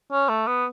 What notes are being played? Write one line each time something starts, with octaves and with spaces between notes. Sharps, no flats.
C#4
A3
B3